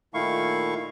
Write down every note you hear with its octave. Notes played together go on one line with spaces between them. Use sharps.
A#2 D#3 A3 E4 F5 C#6